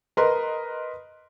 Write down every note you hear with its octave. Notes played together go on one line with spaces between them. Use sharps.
A#4 B4 D#5 C6